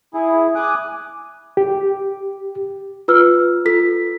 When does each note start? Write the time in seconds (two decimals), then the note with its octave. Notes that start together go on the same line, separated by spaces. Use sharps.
0.14 E4 G#4
0.55 G#5 D6 D#6 F#6
1.57 G4
3.08 F4 B4 E6 F6
3.65 F4 A4 B6